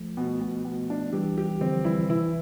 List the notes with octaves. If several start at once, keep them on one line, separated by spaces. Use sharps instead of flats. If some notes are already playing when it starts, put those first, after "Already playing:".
Already playing: F3 A3
B2
B2
B2
D4
E3 G3 G4
G4
D3 F3 C4
E3 G3 E4
C3 E3 E4